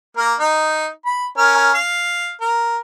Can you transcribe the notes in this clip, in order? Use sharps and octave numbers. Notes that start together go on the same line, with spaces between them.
A#3 A#4
D#4
B5
C#4 A#4 F6
F5
A#4